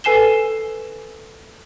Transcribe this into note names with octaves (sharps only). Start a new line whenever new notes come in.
A4 B4 G#5 C7 E7 G7